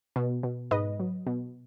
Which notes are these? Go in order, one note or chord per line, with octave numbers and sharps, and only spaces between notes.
B2
B2
G#2 B4 D#5
F#3
B2